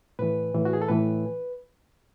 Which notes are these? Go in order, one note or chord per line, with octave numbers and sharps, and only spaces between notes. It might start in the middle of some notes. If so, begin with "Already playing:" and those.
A2 E3 B4
A2 E3
F#4
G#4
A4
A2 E3 B4